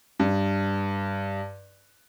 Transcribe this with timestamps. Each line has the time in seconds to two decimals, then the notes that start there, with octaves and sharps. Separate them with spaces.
0.19 G2